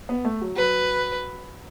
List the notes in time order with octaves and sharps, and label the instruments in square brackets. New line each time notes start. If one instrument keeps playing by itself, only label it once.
[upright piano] B3
A3
F#3
[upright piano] F#3 [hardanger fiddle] B4